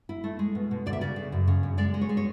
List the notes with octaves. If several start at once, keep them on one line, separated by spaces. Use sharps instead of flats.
E4
A3
G#3
B2
B2
D2 D5
E5
C#3 D5
C#3
F#2
C#3
F#2
G#3 D5
G#3
C#5
G#3
C#5